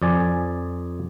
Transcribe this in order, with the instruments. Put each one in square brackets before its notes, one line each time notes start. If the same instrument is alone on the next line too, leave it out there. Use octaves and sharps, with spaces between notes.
[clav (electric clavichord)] F2 D5 G#5